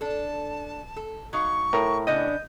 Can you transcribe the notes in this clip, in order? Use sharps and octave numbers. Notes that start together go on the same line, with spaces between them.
D4 A4 A5
A4
F#3 D#4 F5 C#6
A2 A#4
C#3 B3 D4 D#5 G6